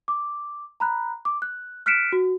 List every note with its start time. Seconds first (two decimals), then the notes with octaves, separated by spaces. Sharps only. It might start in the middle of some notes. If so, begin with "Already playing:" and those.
0.08 D6
0.80 A#5 B5 F#6
1.25 D6
1.42 F#6
1.86 F6 F#6 B6 C#7 D7 E7
2.12 F#4